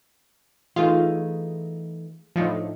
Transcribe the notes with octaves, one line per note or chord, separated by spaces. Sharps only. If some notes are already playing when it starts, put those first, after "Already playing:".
E3 A3 D#4 F4 G#4 F5
A2 F3 D4 D#4